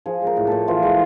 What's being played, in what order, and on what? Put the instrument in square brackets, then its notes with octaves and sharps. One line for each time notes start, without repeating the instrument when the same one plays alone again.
[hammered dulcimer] F3 G#4
G#3 A#4
A2
A2 A4
E3 F4
G#3